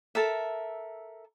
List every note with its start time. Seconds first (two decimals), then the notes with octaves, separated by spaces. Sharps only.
0.15 A4 A#4 E5